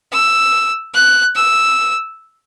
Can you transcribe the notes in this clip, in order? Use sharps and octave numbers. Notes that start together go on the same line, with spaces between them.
E6
F#6
E6